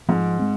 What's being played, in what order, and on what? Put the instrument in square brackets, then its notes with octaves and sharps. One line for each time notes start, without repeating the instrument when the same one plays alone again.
[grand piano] G#2 [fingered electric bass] F3
[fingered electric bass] G#3 C4